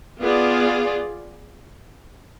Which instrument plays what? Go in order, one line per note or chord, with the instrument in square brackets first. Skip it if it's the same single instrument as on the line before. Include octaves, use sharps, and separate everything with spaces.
[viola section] B3 F4 G#4 D5